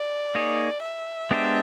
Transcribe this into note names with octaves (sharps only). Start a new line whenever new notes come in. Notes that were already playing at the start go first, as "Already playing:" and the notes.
Already playing: D5
A#3 D#4 G#4 C#5
E5
G#3 B3 D4 G4 C5